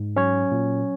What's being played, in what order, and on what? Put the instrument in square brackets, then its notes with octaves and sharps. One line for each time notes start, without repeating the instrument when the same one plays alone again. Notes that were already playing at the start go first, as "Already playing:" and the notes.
Already playing: [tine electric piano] G#2
F#3 C#4 C#5
A#2